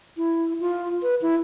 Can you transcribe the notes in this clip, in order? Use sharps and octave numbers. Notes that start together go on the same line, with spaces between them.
E4
F4
B4
E4